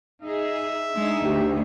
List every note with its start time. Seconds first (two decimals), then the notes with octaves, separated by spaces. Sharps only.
0.22 D#4 G#4 E5
0.95 G#3 D4 D#4
1.25 D2 G4